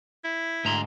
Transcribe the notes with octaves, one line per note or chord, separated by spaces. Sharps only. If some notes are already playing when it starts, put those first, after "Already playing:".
E4
D2 G#2 A#5 C6